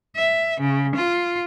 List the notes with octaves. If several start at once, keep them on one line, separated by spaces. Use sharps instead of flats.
E5
C#3
F4